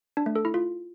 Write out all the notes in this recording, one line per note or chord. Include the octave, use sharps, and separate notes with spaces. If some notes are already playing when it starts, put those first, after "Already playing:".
D4
A3
A4
E4
F4